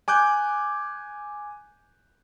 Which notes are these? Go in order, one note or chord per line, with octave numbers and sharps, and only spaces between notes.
G#5 D6 F#6 G6